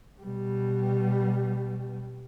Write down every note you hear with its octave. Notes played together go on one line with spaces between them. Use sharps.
B2 G3